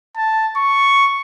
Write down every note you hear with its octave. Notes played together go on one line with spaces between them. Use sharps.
A5
C#6